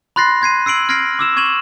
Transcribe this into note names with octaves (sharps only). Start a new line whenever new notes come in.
B5 C6 F#6 A6 A#6 C7
C6 G#6 C7 D#7
E6 C7 D7 F#7
F6 G#6 A#6 C7 D7 F#7
D6 E6 E7
C#6 G#6 D#7 E7 F#7